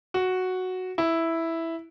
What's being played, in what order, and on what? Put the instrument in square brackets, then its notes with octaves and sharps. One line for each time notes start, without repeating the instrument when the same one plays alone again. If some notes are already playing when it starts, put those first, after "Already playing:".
[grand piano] F#4
E4